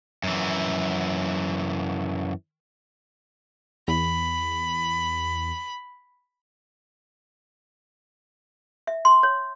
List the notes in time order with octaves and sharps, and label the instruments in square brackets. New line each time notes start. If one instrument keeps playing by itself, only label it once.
[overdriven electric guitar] F#2 E3
[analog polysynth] E2 [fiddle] B5
[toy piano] E5
C6
C#5